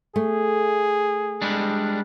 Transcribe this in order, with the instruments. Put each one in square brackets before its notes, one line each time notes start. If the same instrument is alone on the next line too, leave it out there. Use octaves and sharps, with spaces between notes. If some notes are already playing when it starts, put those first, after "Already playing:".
[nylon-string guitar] A3 [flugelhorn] G#4
[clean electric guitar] G3 G#3 D4